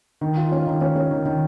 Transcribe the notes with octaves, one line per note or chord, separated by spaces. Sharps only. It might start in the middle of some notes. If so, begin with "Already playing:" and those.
D#3
F4
C#4
D#3
C#4
C#4
D#3
D#3